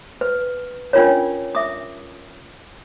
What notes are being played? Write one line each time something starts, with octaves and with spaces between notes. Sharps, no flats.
B4
C#4 D4 F4 A#4 C#5
E5 D6 D#6